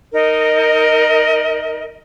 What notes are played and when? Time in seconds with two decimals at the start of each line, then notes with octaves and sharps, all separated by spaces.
0.13 D#4 A#4 D#5